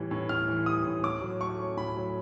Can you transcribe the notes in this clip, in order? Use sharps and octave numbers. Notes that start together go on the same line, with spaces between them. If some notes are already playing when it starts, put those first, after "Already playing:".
Already playing: A2 E3 G3
A2
A2 F6
E3
G3 D#6
A2
A2 D6
F#3
A3 C#6
C#4
A2 B5
F#3